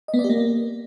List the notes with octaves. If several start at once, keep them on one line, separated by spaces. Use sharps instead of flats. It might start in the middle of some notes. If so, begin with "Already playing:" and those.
D#5
B3
D5
G4
A#3